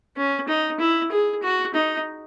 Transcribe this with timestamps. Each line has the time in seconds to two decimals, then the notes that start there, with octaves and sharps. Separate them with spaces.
0.17 C#4
0.49 D#4
0.80 E4
1.12 G#4
1.43 F#4
1.75 D#4